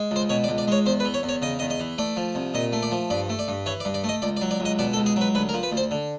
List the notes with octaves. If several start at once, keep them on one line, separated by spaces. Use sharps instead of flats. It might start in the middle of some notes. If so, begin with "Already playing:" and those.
Already playing: G#3
C#2 C5
B2 C#5
D5
C#2
D5
G#3 C#5
E2 C5
B4
E3
C#5
E2
C#5
C#3 D#5
E2 D#5
D#5
E3
A3 D5
F3
C2
A#2 D#5
A3
D5
F3
G2 D5
A3
D5
G2
E3 C#5
D5
G2
D5
A3
D#5
C#2 D5
D5
F#3
D5
C#2
D#5
B2 D5
A4
C#2
G#4
F#3 B4
D2 B4
A#4
F3
B4
D2
C5
D3